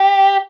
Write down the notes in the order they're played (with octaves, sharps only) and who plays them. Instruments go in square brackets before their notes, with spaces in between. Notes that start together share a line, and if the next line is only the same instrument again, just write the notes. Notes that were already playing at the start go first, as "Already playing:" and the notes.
Already playing: [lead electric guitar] G4